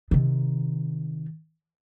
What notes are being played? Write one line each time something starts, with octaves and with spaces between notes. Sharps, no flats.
C3 D#3